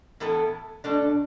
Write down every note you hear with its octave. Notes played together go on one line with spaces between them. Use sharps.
A2 E3 B3 E4 A4
B2 A3 D4